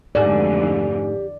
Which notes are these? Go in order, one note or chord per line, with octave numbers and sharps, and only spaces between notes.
F2 G#2 D3 E3 A3 F#4 G4 D5